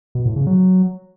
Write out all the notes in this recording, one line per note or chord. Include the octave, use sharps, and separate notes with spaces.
B2
A2
C#3
F#3